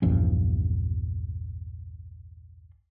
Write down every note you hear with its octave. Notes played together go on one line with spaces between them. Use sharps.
A#1 E2 G2 C#4